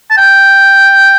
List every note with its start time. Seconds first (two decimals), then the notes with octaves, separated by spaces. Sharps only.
0.10 A5
0.17 G5